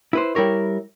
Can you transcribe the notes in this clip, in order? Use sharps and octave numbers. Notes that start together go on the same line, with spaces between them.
E4 B4 C5
G3 E4 A#4 C#5